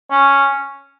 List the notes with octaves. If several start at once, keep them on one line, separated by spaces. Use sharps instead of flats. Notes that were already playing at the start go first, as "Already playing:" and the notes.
C#4